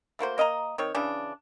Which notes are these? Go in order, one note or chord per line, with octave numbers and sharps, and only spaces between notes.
A3 A#3 F#4 C5
A#3 D#5 E5 A#5
D#3 C4 C#5
C#3 E3 D4